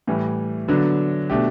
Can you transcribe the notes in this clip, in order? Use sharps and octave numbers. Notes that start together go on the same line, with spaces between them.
A2 E3 G3
D3 F#3 B3 D4
B2 A3 D4 G4